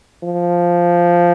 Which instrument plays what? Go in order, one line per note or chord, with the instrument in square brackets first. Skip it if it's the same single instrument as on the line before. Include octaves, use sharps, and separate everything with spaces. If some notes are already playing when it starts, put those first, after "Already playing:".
[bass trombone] F3